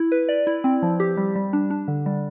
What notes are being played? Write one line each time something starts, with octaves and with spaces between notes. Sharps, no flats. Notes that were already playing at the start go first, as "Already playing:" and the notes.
Already playing: E4
B4
D5
E4
C4
F3
G4
G3
G3
D4
D4
D3
G3